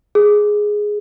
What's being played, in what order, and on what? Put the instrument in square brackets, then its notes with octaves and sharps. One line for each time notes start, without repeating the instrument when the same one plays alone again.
[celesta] G#4